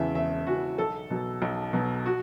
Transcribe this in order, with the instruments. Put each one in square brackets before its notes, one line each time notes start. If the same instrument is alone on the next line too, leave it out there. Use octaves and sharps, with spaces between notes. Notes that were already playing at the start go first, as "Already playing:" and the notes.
Already playing: [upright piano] E1 E2 C#3 E3 E5
E1 E5
E2 C#3 E3 F#4
B1 A4
B2 F#3
B1
B2 F#3
F#4